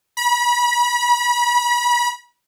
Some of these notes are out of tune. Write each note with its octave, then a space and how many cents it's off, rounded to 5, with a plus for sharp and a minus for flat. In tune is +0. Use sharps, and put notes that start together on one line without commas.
B5 -35